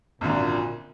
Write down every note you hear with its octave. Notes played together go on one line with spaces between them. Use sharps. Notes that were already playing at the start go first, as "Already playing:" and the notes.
G#1 F#2 A#2 D3